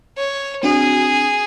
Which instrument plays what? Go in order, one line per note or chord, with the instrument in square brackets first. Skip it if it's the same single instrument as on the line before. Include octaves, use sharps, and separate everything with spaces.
[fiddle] C#5
[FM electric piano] C4 D4 F#4 [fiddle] G#4